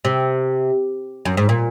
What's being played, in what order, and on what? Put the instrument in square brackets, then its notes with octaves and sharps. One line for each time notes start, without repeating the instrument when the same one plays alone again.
[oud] C3
F#2
G#2
A#2